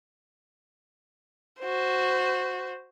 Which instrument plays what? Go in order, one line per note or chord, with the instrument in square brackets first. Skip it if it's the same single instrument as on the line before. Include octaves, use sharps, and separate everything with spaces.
[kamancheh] F#4 C5